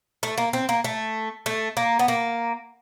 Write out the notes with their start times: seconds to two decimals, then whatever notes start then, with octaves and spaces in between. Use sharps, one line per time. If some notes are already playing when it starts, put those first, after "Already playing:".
0.23 A3
0.38 A#3
0.53 C4
0.69 A#3
0.84 A3
1.46 A3
1.77 A#3
1.99 B3
2.08 A#3